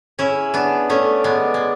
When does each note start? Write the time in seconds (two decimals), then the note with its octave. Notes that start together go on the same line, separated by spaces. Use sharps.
0.19 C#4 E4 G#4
0.54 B3 D4
0.90 A3 C#4 D5
1.24 G#3 B3
1.54 G#3